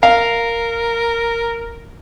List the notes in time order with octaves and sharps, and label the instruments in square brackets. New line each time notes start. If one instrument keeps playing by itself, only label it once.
[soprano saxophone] A#4 [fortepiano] F5